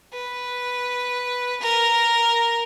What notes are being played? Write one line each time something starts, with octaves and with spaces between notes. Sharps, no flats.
B4
A#4